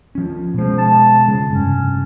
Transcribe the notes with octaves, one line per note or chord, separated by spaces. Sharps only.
F3 C#4
B2 F3 G#3
A5
C#3 G#3
F1 C2 G2 C#4